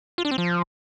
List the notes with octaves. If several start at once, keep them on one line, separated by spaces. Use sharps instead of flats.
F4
D4
C4
F3